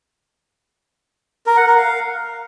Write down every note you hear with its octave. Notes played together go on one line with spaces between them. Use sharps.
A#4
F#5
A#4
F5